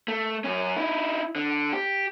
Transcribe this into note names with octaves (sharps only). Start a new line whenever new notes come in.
A3
F#2 C#4
D#4 E4
D3
G4